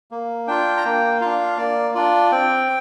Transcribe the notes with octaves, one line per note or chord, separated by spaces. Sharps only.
A#3
D4 F4 G5
A#5
A#3 G5
D4 F4 F5
A#3 D5
D4 F4 D5
C4 G5